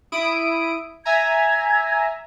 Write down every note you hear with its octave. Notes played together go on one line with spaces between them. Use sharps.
E4 D#6 D7
E5 G#5 A#5 G#6